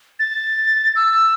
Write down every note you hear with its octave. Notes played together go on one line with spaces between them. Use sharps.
A6
E6